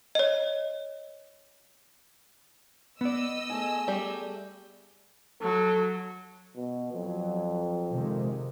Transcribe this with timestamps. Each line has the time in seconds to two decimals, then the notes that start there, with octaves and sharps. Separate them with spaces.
0.15 C#5 D#5
3.01 B3 D5 D#5 E6
3.50 A3 G#4 G#5
3.88 G3
5.42 F#3 A4
6.56 B2
6.93 F2 F#3
7.92 C3 D#3 G#3